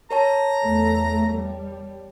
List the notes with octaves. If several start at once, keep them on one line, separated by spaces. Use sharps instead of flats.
A#4 C#5 A5 A#5
E2 A3
G3